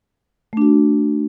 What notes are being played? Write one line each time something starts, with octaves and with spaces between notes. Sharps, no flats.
A3 D4 F#4